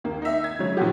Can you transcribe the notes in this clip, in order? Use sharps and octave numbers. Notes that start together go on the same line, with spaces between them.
D#2 A#3
D#4 E5
G#6
C#3 F#3
A#2 D#3 F3 F#4 G4